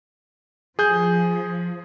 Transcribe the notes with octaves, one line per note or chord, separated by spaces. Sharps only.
F3 G#4 G6